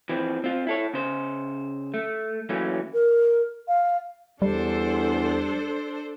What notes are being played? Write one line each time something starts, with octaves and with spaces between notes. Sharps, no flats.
E3 F3 C4
C4 F4
E4 A4 C#5
C#3 C5
A3
E3 F#3 A3 A#3 C#4
A#4
F5
E2 G3 D4 A4 C5